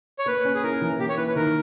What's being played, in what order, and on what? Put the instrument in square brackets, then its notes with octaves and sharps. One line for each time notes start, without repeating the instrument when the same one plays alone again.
[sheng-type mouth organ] C#5
[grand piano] A#3 [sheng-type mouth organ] B4
[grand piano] C#4
[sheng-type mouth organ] G#4
[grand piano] E4 [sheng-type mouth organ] A#4
[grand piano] E3
[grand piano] A#3 [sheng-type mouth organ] G4
[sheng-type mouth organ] C#5
[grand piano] E4 [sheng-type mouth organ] B4
[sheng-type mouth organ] B4
[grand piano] D#3 [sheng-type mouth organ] A#4